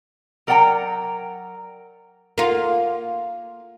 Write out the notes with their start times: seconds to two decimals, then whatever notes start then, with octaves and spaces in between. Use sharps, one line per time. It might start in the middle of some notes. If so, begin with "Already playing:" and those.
0.47 F#3 A#4 D5 F#5 G5 A#5
2.38 A#3 F4